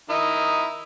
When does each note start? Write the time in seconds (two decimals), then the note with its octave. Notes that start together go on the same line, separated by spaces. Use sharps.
0.10 D#3 D#4 E4